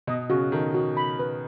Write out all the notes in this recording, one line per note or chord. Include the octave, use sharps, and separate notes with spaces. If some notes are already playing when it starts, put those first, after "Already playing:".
B2 D#5
C#3 F#4
D#3 A4
F#4
B5
B4